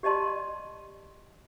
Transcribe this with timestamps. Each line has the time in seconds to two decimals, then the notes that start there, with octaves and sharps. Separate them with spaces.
0.03 G4 D5 D#5 A5 C6